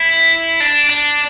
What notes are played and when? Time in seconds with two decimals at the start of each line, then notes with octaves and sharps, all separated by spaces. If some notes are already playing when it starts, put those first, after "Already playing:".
Already playing: E4
0.60 D4
0.90 D4